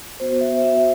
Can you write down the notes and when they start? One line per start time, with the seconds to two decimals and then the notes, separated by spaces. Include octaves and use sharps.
0.20 B3 F#4 C5
0.41 E5
0.62 B3 F#4 E5